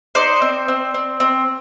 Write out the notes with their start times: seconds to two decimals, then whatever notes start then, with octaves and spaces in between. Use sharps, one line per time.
0.15 D#4 C5 D5
0.42 C4
0.68 C4
0.94 C4
1.20 C4